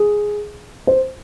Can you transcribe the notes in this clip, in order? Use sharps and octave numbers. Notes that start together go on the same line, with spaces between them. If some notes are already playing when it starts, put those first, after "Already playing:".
Already playing: G#4
C5